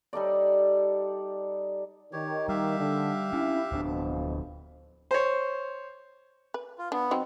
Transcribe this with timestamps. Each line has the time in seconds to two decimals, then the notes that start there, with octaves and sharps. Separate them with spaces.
0.13 G3 D#4 A4 D5
2.13 D#3 G4 C#5
2.49 G3 G4 E5 F5
2.78 D3
3.33 C#4 D4 E4
3.72 D1 F2 B2 F3 D4
5.11 C5 C#5
6.54 B4
6.78 F4
6.92 B3 D4
7.11 F#3 C4 D#4